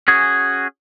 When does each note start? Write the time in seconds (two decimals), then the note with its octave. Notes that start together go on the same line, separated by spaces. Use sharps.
0.08 C#4 F#4 G#4